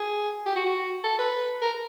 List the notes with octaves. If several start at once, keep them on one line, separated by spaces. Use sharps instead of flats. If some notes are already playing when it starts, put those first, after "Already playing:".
Already playing: G#4
G4
F#4
F#4
A4
B4
A#4